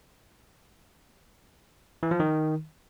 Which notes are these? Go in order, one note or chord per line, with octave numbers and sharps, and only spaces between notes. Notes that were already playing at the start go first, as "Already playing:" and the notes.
E3
F3
D#3